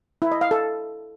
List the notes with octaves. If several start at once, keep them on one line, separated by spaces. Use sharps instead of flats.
E4
D#5
F5
A4